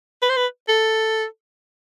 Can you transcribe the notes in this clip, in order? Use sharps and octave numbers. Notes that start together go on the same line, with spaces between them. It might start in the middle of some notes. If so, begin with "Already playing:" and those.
B4
C5
B4
A4